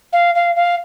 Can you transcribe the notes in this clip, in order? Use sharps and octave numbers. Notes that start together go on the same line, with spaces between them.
F5
F5
F5